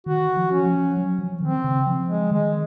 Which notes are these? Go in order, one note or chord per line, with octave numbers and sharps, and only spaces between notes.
D#3 F#4
F3
C#4
F3
F#3
F3
D#3 C4
C#3
F3
G#3
D#3 G#3